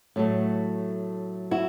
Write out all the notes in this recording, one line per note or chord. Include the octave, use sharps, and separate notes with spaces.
A2 F#3 A3
E4 F#4